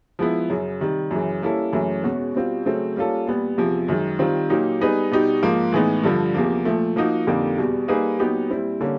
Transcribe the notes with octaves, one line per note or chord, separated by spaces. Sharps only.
F3 G#3 B3 E4
F#2 C#3 F#3
C3 D#3 G3
F#2 C#3 E3
G3 A#3 C#4 E4 A4
F#2 C#3 E3 A3 C#4
E2 B2 G#3 C#4 F#4
B2 G3 C4 F4
C#3 F#3 A3 C4
G3 A#3 C#4 F4 A4
A#2 G3 B3
E2 C3 F3
F#2 D#3 G#3
D#3 G3 C4 F4
A#2 F#3 A#3 D#4 G4
G3 B3 D#4 G#4 B4
B2 G3 B3 D#4 G4
G#2 F3 A#3
A2 E3 G#3 B3 D#4
G2 D3 F3
E2 C3 F3 A#3
A#2 F3 A3
F3 A#3 D#4 F#4
F2 D3 G3 A#3 D#4
E2 B2 G3
G3 A#3 D#4 G#4 B4
A#2 F#3 B3 D#4 G4
A#2 G3 C4 E4
D3 G3 A#3 C#4